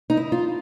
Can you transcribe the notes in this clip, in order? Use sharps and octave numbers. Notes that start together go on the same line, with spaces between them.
D#4
E4
F4